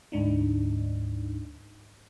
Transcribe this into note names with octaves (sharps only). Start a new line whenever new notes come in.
D2 G#2 D4 D#4